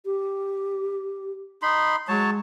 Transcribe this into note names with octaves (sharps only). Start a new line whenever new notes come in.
G4
D#4 B5 C6
F#3 G#3 C#5 A5